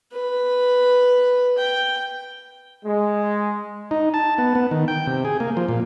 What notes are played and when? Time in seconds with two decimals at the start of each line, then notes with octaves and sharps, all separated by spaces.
0.12 B4
1.58 G5
2.85 G#3
3.91 D#4
4.14 A5
4.38 B3
4.55 B3
4.71 D#3
4.88 G5
5.07 C3
5.25 G#4
5.40 A#3
5.57 F3
5.69 A#2